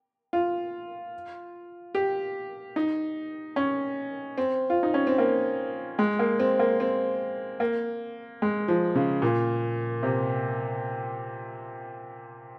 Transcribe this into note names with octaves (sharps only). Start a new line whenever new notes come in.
F4
G4
D#4
C#4
C4
F4
D#4
C#4
C4
A#3
G#3
A#3
C4
A#3
C4
A#3
G#3
F3
C#3
A#2
C3